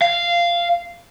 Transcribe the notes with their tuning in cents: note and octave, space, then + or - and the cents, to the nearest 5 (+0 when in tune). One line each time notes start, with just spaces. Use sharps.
F5 -10